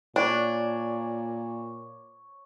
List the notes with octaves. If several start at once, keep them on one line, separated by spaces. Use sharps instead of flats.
A#2 D4 C#5 D6